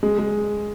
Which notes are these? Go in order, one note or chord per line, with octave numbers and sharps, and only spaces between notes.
G#3
G#3